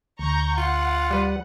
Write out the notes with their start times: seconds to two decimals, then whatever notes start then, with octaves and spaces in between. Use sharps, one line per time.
0.19 D2 A#5 C#6 G6
0.57 F4 F#5
1.11 G3 B4